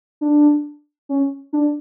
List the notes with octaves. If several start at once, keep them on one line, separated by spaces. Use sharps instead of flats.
D4
C#4
D4